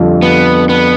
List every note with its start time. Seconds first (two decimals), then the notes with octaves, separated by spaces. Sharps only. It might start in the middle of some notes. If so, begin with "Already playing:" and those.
Already playing: F2 D3 G3 D4 F4
0.22 B3
0.69 B3